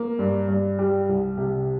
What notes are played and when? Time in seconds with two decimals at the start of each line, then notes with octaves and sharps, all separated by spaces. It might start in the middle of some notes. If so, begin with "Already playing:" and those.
Already playing: A#3
0.19 G2
0.49 G2
0.79 G3
1.09 C2
1.38 C3